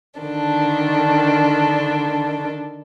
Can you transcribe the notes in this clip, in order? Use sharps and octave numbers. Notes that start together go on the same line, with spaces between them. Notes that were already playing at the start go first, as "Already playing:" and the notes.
D3 D#3 D4 A4